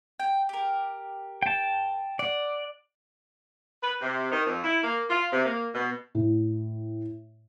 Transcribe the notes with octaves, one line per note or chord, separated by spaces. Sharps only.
G5
G4 A#4
G5 A5
D5 F#5
B4
C3
D#3
F2
E4
A#3
F4
C3
A#3
B2
A2